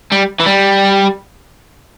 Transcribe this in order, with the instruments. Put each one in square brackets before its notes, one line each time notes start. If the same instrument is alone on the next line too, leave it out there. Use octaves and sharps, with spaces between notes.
[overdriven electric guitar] G3
E3
G3